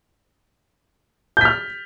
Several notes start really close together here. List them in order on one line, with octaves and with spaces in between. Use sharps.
G6 B6 F6